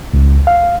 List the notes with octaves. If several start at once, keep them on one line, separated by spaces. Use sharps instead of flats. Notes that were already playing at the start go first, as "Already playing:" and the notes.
C#2
F5